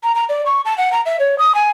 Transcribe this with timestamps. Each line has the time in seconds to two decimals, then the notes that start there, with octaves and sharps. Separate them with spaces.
0.03 A#5
0.15 A#5
0.29 D5
0.46 C#6
0.65 A5
0.78 F#5
0.92 A#5
1.06 E5
1.20 C#5
1.38 D#6
1.55 G#5